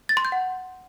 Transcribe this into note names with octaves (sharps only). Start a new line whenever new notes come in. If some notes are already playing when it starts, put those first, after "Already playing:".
A6
C6
G6
F#5